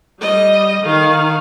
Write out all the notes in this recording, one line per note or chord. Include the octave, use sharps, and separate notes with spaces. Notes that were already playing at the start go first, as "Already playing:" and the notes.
G3 D#5
D#3 F5